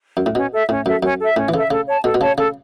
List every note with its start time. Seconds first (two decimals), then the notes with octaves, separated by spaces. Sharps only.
0.17 F#2
0.26 A2
0.35 B2 C#4
0.52 A4 E5
0.69 A2 C#4
0.86 F#2 A4 E5
1.03 F#2 C#4
1.20 A4 E5
1.36 A2 C#4
1.49 E3
1.53 C#3 A4 E5
1.70 C#3 A4
1.87 C#5 A5
2.04 B2 A4
2.14 B2
2.21 C#3 C#5 A5
2.37 C#3 A4